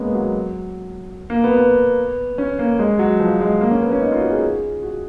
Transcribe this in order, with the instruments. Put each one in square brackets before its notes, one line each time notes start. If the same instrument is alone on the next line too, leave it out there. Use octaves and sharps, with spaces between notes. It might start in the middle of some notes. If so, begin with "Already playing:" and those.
Already playing: [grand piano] G#3 A#3 B3 C#4
F#3
A#3
B3
B3
C#4
A#3
G#3
F#3
F3
G#3
A#3
C#4
B3
C#4
D#4
F4
F#4
G#4
F#4